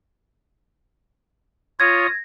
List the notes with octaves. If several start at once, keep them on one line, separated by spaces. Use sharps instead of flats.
F4 C#5 D#6 G#6 A#6